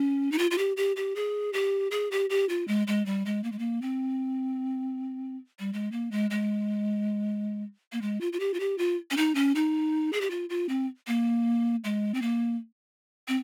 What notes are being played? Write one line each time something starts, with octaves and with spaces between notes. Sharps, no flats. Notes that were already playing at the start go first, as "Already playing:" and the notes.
Already playing: C#4
D#4
F4
F4
G4
G4
G4
G#4
G4
G#4
G4
G4
F4
G#3
G#3
G3
G#3
A#3
G#3
A#3
C4
G3
G#3
A#3
G#3
G#3
A#3
G#3
F4
F4
G4
F4
G4
F4
C#4
D#4
C#4
D#4
G#4
G4
F4
F4
C4
A#3
G#3
C4
A#3
C4